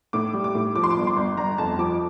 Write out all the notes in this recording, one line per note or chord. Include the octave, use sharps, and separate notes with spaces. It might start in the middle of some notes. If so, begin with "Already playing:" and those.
A2 D6
G3
D6
A2
F3 D6
C6
D6
G1
C6
G1
G1 A#5
F2 A5
F3 D6